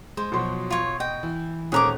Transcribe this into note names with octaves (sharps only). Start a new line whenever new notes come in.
G#3 C5
B2 F3 F#3 B3 C6
F4 C#5
D#5 G5
E3
D#1 G#3 C#4 G#4 A#4 D6 F#6